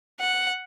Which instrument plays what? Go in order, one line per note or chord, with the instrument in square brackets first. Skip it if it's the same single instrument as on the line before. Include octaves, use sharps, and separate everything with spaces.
[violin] F#5